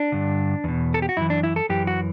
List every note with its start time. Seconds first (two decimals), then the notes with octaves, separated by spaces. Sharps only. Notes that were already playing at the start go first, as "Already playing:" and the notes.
Already playing: D4
0.12 G2 D3
0.64 E2 B2
0.94 A4
1.02 G4
1.09 F#4
1.17 F#2 E3 E4
1.30 D4
1.43 E4
1.56 A4
1.69 F#2 E3 G4
1.87 F#4